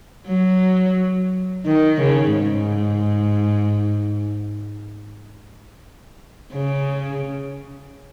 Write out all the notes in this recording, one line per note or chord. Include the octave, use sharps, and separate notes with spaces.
F#3
D#3
C#3
G#2
C#3